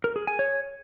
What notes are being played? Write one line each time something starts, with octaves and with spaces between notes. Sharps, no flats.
A#4
G#4
G#5
C#5